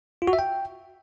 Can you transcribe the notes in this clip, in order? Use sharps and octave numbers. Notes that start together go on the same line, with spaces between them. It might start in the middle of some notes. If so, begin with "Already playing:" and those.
F4
F#4
E5
G5